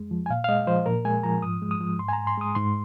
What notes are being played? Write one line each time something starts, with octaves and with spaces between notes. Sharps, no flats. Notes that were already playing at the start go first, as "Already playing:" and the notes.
Already playing: F2 G#3
F3
G#5
A#2 F5
F5
G#3 D#5
F3 C5
A#2 A#4
G#3 G#5
F3 A#5
G#2 D#6
G#3
D#6
F3
G#2 C6
G#5
A#5
G#2
C6
G#3 D#6
G#2 C6